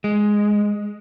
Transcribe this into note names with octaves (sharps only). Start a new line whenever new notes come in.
G#3